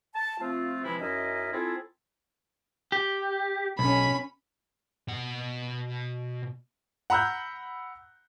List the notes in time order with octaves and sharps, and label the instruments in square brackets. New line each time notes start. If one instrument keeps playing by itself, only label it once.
[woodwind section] A5
F3 A3 C4 F4
C3 E3 F3 G#3 E4 B5
F#2 C#4 D#4 E4 D#5
C4 E4 F4 G#4 A4
[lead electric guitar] G4
[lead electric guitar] B1 [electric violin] C#4 B5
[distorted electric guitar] B2 F#5
[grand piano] F#5 A#5 B5 E6 F#6 G6